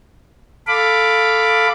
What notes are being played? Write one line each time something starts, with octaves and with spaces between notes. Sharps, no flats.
A4 F5 B5 D6